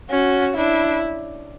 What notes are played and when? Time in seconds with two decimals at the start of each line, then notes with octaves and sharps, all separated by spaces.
0.10 C#4 F#4
0.57 D4 E4